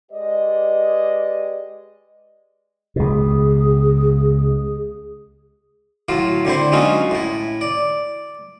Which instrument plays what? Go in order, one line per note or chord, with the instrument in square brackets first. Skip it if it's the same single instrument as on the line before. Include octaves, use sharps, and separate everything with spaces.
[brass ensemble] G#3 G4 B4 D5 D#5
[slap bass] C#2 B2 [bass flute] G#4
[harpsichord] A2 F#3 F4
D3 C4 E4 C5
F#3 G#3 C#4 D#4 F4 F#4
A2 E4
D5